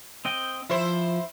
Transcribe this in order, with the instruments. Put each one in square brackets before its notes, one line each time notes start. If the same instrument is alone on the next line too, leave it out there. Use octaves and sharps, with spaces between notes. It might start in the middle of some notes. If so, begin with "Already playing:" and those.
[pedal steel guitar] C4 D#5 G5
[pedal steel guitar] F3 [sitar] E4 C5